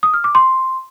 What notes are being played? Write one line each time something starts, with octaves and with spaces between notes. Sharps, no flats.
D#6
F6
D6
C6